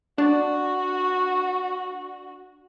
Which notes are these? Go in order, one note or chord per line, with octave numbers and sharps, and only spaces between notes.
D4 F#4